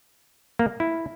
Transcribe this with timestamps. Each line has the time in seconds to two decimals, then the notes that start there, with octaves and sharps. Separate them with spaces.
0.59 A#3
0.80 E4